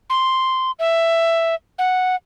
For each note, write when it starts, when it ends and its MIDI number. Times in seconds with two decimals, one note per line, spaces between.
0.10 0.71 84
0.79 1.55 76
1.79 2.15 78